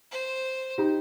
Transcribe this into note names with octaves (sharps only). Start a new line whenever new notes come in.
C5
D#4 G4